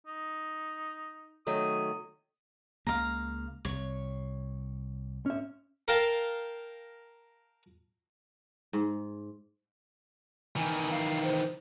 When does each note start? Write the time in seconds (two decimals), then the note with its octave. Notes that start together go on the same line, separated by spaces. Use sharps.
0.07 D#4
1.47 D#3 F#3 A3 D#6
2.87 C#2 C#3 A#3 F5 A#5
3.65 C2 C#5
5.26 C#4 E5
5.88 A#4 F5 G5 A5 A#5
8.73 G#2
10.56 D#3 E3 G#5
10.91 F5
11.23 C5